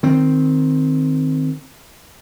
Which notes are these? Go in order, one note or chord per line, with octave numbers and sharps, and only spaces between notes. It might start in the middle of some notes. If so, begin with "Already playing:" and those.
D#3 C4